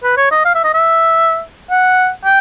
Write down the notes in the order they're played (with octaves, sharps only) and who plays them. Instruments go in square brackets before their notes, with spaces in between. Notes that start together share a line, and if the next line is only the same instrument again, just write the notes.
[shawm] B4
C#5
D#5
F5
E5
D#5
E5
F#5
G5